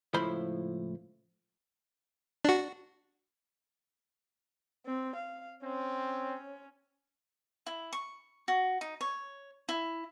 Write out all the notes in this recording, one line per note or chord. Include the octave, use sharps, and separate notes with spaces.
C#2 A2 F3 E4 C5 B5
D4 F#4
C4
F5
C4 C#4
E4
C#6
F#4
D#4
C#5
E4